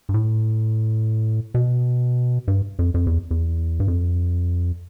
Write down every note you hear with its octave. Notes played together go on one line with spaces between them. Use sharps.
G2
A2
B2
G2
F2
F2
E2
E2
G2
F2